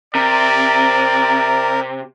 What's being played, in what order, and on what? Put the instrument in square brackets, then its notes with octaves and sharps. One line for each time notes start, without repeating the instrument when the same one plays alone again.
[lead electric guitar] C3 [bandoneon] A#4 [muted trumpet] D5